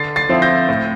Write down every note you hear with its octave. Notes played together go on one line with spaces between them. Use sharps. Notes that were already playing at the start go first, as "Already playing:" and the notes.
Already playing: D3 A6 C7
A6 C7
F3 C4 E4
G6 A#6
A2